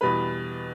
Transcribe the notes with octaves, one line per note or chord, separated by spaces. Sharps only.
E2 B2 G3 B4 B5